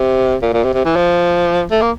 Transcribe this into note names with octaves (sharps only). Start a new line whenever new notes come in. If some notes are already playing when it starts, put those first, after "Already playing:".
Already playing: C3
A#2
A#2
C3
C3
E3
F3
A3
A#3